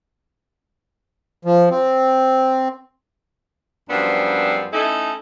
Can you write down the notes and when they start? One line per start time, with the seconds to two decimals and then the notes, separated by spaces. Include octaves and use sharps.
1.45 F3
1.70 C4
3.89 F#2 F3 G3 B3 C4 D4
4.73 A3 C#4 D#4 E4 A4